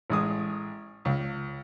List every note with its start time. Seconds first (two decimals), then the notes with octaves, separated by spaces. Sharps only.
0.10 A1 G#3 D#6
1.05 C#2